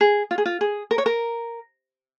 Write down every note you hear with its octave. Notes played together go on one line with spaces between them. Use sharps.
G#4
F4
G#4
F4
G#4
A#4
C#5
A#4